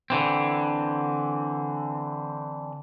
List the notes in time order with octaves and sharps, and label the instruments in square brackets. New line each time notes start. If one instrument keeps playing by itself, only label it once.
[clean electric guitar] D3 E3 C4